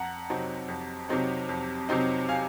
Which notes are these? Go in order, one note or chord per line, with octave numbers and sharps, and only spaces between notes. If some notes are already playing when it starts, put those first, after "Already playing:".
Already playing: F2 F#5 A#5
C3 F#3 C4 D#4
F2
C3 F#3 C4 D#4
F2
C3 F#3 C4 D#4
F5 G#5